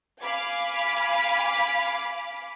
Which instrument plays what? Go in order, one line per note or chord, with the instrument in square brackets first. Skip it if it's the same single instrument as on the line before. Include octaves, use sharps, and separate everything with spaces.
[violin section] F5 G#5 B5 D6